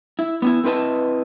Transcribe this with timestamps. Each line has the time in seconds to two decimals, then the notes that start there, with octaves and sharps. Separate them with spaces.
0.19 E4
0.42 B3 C#4 E4
0.64 A3 C4 E4 B4 D#5 A5